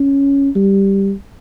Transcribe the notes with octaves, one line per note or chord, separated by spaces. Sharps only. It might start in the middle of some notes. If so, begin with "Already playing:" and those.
Already playing: C#4
G3